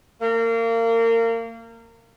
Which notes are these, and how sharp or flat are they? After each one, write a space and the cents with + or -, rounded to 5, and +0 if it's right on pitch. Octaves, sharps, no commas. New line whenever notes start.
A#3 -30